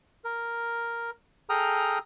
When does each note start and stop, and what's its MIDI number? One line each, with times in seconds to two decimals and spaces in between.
0.24 1.10 70
1.50 1.98 68
1.50 1.98 69
1.50 1.98 79
1.50 1.98 82
1.50 1.98 87
1.50 1.98 89